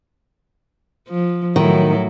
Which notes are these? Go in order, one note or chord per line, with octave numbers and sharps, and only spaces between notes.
F3
A2 D#3 F#3 E4